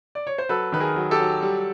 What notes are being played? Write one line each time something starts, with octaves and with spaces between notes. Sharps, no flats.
D5
C#5
C5
F#3 A4 B4
D#3 B4
G#4 A#4
F#3
G4 A4
F#3
G3